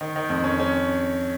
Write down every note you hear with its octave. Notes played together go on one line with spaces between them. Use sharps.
D#3
D#3
F2
C#4
C#4